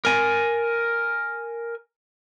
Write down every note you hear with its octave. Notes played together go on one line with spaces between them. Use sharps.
A#4 G#5